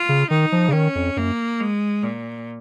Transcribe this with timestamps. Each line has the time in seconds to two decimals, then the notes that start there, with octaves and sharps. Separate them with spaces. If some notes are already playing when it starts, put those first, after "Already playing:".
Already playing: F4
0.09 C#3
0.30 D#3 D#4
0.52 F3
0.68 C#3
0.73 D#3 C#4
0.95 F2
1.16 F#2 A#3
1.60 G#3
2.03 A#2